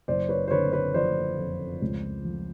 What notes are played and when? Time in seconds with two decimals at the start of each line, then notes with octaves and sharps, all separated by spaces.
0.08 F#1 C5 D5
0.29 B4 C#5
0.48 C5
0.51 D3 B4 C#5
0.72 B4 C#5
0.94 F3 C5 D5
1.38 F2
1.82 C#2
2.24 F3